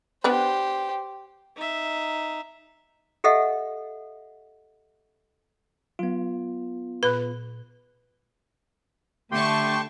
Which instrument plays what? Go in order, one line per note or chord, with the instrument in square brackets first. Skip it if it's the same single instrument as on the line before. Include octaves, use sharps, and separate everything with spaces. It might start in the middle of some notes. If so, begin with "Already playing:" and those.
[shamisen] B3 D4 B4 [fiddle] G4 C5
[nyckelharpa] D#4 E5
[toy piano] G4 A4 D#5 E5 F#5
[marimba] F#3 [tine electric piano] B3 F4
[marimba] A#2 B5 F#6 [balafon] B4
[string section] D3 A5 C#6 [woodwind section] A3 [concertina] G4 G5 C6